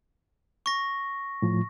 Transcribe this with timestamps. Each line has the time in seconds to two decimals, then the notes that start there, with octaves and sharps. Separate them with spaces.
0.66 C#6 A#6
1.42 A2 F3